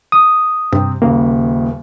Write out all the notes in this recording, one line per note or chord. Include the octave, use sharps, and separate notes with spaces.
D#6
G2 C3 C4
D#1 C#3 A#3